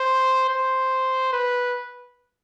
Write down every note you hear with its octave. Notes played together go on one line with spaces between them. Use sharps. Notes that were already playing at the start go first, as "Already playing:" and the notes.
Already playing: C5
C5
B4